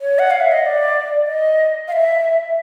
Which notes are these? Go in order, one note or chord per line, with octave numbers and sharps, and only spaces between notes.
C#5
F#5
F5
E5
D#5
D#5
D5
D#5
F5
E5